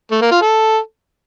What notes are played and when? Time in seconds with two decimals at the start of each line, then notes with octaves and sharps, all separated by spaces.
0.11 A3
0.21 A#3
0.31 F4
0.42 A4